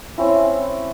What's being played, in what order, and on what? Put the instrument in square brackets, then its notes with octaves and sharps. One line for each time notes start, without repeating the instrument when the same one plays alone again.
[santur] C4 C#4 E4